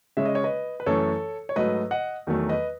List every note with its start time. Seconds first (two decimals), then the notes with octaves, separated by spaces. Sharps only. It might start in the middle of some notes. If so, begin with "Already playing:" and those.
0.17 C#3 G#3 C#4 E5
0.26 D#5
0.35 C#5
0.44 B4 D#5
0.80 B4
0.86 F#2 E3 A3 C#4 A4 C#5
1.49 C#5
1.56 G#2 F#3 A3 B4 D#5
1.91 D#5 F#5
2.27 E2 D#3 F#3 A3
2.49 B4 D#5